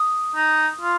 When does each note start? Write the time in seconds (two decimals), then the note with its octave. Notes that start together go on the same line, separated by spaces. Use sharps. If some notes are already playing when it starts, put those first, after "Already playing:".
Already playing: D#6
0.36 D#4
0.81 F4